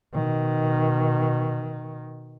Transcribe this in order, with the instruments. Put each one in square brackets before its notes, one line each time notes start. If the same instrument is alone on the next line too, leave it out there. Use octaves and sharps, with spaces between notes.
[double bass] B2 D#3